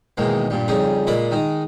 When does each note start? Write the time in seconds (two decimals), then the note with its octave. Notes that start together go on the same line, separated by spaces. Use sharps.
0.17 B1 E2 G#2 D#3 G#3 A#3
0.50 G2 A#2 G3
0.68 F2 C#3 G3 D#4 G#4
1.07 A#2 G#3 A#3 D5 D#5 B5
1.31 D#3 G#3 D#4